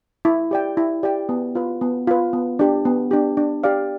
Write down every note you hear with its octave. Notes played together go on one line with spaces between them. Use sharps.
E4
G4 D5 G5
E4
G4 D5 G5
B3
F4 B4
B3
F4 B4
B3
D4 G4
B3
D4 G4
D4
G4 D5 F5